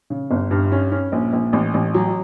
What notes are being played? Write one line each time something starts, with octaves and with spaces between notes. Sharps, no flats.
C#3
G1
G2
C#4
C#4
A#1
A#1
A1
A1
F#3